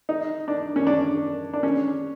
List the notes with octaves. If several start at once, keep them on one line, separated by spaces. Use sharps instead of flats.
D#4
D4
C#4
D4
D4
C#4